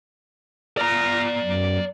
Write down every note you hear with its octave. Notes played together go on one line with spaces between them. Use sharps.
D5 A#5 F6 A#6
F#2